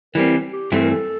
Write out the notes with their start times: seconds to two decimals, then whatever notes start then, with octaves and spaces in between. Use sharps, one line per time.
0.15 E3 G3 C4 A#4
0.53 G4
0.72 G2 E3 A3 C4 A4
0.82 A#4
0.91 A4